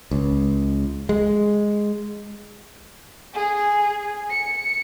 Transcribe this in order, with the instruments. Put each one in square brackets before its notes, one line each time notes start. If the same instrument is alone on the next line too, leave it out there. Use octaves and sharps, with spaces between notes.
[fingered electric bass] C#2
G#3
[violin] G#4
C#7